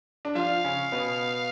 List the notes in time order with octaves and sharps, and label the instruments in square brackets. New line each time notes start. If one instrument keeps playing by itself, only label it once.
[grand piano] D4
[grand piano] F3 F4 [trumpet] F5
[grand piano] C#3 C#4
B2 B3